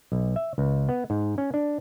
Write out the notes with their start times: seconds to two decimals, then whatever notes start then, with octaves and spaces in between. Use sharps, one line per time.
0.12 B1
0.36 E5
0.58 C#2
0.89 B3
1.10 G#2
1.38 C#4
1.54 D4